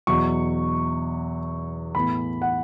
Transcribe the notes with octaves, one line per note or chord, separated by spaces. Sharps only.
E2 B2 F#3 C#6
A2 E3 B3 B5
F#5